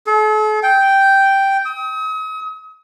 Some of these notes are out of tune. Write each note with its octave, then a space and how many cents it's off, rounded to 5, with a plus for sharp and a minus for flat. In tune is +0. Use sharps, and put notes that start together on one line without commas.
A4 -45
G5 -5
D#6 +40